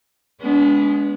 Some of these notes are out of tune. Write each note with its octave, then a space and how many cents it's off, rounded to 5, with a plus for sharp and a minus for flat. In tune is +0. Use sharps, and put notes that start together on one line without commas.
G#3 +15 B3 +0 D4 -35